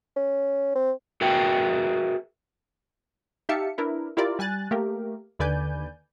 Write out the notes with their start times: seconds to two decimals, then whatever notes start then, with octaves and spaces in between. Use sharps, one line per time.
0.16 C#4
0.75 C4
1.21 F#4 G#4 A#4 B4 E5 G5
3.49 D#4 G4 E5 F5 A5 C#7
3.78 D4 E4 A#4 B4
4.17 E4 F4 G4 A#4 D5
4.39 G3 G#5 F#6 A6
4.71 A3 A#3 G4 A#4
5.39 D#2 D3 B4 D5 G#5 G6